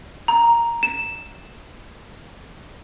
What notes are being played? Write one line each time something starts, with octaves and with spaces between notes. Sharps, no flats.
A#5
E7